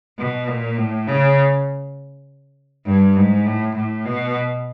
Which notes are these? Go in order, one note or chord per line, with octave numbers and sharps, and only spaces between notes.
B2
A#2
A2
C#3
G2
G#2
A2
A2
B2